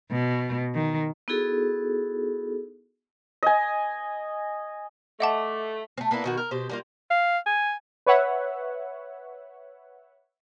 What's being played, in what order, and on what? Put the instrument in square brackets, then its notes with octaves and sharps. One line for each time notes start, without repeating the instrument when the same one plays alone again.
[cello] B2
D#3
[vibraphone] B3 D#4 E4 F#4 G#4 A4
[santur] D#5 G#5
[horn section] A3 [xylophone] D#5 F#5 A5 [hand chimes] E5 D6
[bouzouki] A3 C4
A#3 B3 D4 E4
B2 D#3 F#4
A#4
B2 G4 C5
G3 A#3 F4
[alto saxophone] F5
G#5
[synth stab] B4 C#5 E5 F#5